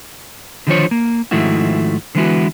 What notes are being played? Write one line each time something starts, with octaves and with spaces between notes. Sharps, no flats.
D3 D#3 F3 F4 C5 C#5
A#3
G#2 D#3 F3 A3 E4 F#4
D3 E3 G#3 B3 E4 F#4